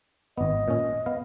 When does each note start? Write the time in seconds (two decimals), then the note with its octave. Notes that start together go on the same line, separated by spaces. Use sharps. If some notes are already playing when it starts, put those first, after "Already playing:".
0.38 G#1 B3 D#5
0.68 A#2 C#4
1.06 B3 F5